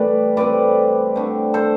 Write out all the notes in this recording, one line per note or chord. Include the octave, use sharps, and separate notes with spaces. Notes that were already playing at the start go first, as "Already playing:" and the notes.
Already playing: A2 E3 G3 A3 B4 D5
A2 G3 C4 B4 D5
D3 A3 C4
A4 C5